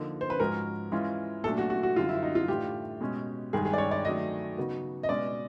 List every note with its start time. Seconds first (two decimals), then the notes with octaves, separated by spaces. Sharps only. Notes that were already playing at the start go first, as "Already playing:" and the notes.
Already playing: D3 F3 A#3 D#4
0.21 C5
0.30 B4
0.40 G#2 F3 G#3 C#4 F#4 A#4
0.92 E3 G#3 C#4 F4
1.43 A#2 F#3 A3 D4 A4
1.58 F#4
1.70 F#4
1.83 F#4
1.96 F#2 D3 G3 F4
2.09 E4
2.23 D#4
2.35 F4
2.48 A2 E3 A3 D4 F4 G4
3.00 B2 G#3 C#4
3.53 G2 D#3 G#3 G#4
3.65 G#4
3.73 D5
3.78 C#5
3.91 D5
4.05 D#3 F#3 A3 D#5
4.58 C#3 F#3 B3 D#4 F#4
5.03 D#5
5.09 B2 G#3 C#4 D5